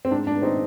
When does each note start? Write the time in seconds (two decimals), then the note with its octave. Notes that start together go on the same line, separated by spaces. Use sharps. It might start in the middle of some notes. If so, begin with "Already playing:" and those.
0.05 C4
0.11 G#2 D4
0.27 D4
0.34 B3
0.42 C4 D#4